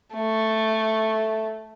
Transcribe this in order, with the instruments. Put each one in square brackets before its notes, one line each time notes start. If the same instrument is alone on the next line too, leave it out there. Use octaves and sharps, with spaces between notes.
[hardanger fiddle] A3